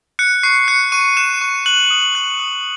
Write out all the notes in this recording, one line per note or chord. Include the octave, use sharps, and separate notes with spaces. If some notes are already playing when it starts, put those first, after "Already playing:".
F#6 C#7
C#6 C7
F#6 C#7
C#6 D#7
F#6 E7
C#6
F#6 F#7
D#6
F#7
F#6
D#6